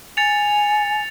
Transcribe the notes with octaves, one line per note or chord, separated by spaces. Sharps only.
G#5 A6 C#7 F7